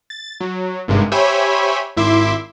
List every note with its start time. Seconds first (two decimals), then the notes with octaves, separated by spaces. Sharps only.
0.10 A6
0.40 F#3
0.88 G#1 G2 C3 G#3
1.12 G4 C5 C#5 E5 G#5 B5
1.97 G#1 E4 E5 C6 D6